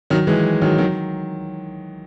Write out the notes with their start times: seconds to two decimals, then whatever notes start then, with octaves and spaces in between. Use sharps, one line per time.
0.10 D#3 F#3
0.27 E3 G#3
0.61 D#3 F#3
0.78 D#3 F#3